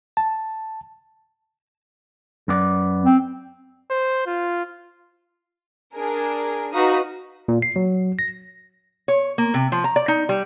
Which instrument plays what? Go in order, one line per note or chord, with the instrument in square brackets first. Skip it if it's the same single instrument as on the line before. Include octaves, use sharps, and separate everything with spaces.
[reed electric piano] A5
[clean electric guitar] F#2 B3 D5
[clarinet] C4
[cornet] C5
F4
[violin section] D4 G#4 A#4
D#4 F#4 B4 F5 A#5 D#6
[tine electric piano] A#2
C7
F#3
A#6
[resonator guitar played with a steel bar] C#5
A#3
C3
F3
A#5
D5
D#4
G3